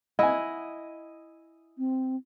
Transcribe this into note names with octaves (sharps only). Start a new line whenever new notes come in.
E4 D#5 F#5 G#5
C4